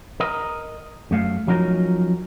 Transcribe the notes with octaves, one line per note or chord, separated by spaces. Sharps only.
A#4 D#5
F#2 A3 F5
F3 F#3 C#4 D#4 A#4